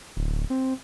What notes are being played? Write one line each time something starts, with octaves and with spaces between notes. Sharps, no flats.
D1
C4